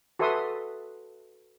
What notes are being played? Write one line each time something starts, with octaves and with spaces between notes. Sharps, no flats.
F#4 A4 B4 E5 C6 D#6